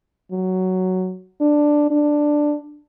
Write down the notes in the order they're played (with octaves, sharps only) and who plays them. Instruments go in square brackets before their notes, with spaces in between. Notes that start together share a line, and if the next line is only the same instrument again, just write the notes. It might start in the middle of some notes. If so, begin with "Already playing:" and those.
[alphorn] F#3
D4
D4